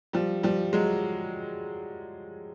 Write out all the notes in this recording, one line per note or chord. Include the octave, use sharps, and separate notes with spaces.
F3 G3
F3 G3
F#3 G#3